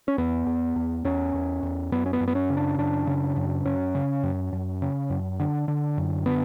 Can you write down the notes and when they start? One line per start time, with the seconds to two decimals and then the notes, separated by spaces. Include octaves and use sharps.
0.08 C#4
0.18 E2 B3
0.46 E2
0.76 E2
1.05 E2 C#4
1.34 E2
1.63 E2
1.92 F#2 B3
2.06 C#4
2.13 B3
2.21 F#2
2.28 B3
2.35 C#4
2.50 C#3
2.57 D4
2.78 F#2 D4
3.07 C#3
3.37 F#2
3.65 F#2 C#4
3.95 C#3
4.23 F#2
4.53 F#2
4.82 C#3
5.10 F#2
5.39 D3
5.68 D3
5.98 F#2
6.26 D3 B3